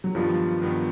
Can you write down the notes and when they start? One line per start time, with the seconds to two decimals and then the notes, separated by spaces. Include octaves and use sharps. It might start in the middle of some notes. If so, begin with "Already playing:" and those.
0.04 F#3
0.15 G2 D#3 F3 G3 B3
0.62 G2 D#3 G3 B3